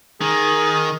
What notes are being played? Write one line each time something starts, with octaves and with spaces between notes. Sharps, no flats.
D#3 G#4